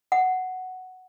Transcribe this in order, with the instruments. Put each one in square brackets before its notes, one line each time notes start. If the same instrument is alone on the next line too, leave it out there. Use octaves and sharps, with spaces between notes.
[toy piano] F#5